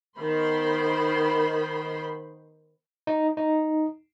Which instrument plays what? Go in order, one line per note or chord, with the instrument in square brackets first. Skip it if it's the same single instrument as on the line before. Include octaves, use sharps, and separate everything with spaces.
[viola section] D#3 B3 C5 B5 C6
[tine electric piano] D#4
D#4